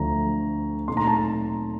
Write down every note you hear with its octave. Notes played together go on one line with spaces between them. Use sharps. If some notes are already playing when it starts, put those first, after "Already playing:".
Already playing: D2 D3 F3 A3 A#5
A#2 A3 D#4 C6
A#5
A5
A#5